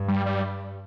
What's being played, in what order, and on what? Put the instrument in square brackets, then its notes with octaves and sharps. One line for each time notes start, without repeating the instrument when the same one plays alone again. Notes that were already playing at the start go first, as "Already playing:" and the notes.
Already playing: [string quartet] G2
[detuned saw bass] G3
G3